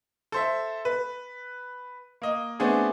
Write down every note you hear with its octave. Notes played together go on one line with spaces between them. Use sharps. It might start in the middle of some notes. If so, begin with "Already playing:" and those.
A4 C5 E5
B4
A#3 D#5
A3 B3 C4 D4 G#4 A4